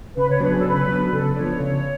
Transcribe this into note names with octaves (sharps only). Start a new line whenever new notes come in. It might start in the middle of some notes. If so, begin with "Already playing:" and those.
C#3 B4
C#5
F#3 B3 D4 B4
G#4
A4
C#3 B4
F#3 B3 D4
C#3 A4
F3 B3 D4 C#5
C#3